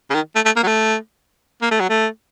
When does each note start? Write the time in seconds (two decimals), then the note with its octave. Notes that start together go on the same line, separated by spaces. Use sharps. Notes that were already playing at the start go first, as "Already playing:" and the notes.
0.10 C#3
0.14 D#3
0.35 A3
0.46 A3
0.56 A#3
0.63 F#3
0.68 A3
1.62 A#3
1.71 A3
1.81 F#3
1.90 A3